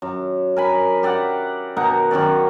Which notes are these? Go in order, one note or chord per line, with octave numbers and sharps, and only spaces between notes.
F#2
A#4 G#5 B5
G4 D5 E5 F#5
B2 D#4 A#4 F#5
F#2 D#3 C#4 D5